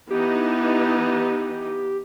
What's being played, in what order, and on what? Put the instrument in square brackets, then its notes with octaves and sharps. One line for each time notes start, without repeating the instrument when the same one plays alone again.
[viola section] E3 D#4 [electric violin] B3 [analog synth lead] G4